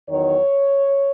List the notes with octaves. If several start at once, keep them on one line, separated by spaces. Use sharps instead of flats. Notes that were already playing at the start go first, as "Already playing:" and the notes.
E2 D#3 F#3 C#5